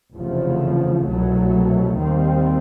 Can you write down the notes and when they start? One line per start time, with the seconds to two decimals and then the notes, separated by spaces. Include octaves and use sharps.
0.14 F1 E2 C#3 F3 A3
1.04 C2 B2 F#3 A3
1.94 D#2 D#3 G3 C4